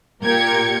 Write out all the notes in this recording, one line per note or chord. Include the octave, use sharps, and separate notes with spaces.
A#2 G4 A#4 G5 G#6 C#7